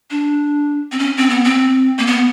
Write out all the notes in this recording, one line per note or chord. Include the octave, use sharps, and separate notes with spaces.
D4
C4
C#4
C4
B3
C4
A#3
B3